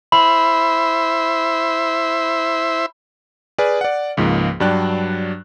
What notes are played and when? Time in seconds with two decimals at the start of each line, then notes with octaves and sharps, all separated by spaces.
0.12 E4 C5 E5 B5
3.58 G#4 B4 D5 G#5 F6
3.81 D5 F#5
4.17 C#2 G#2 F3 A#3
4.60 G2 F#3 D4 D5 G5 F#6